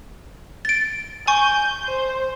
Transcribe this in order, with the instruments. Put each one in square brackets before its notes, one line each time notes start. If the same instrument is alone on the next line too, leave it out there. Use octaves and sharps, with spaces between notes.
[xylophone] A6 D7
[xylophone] G#5 C#6 [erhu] G6
[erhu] C5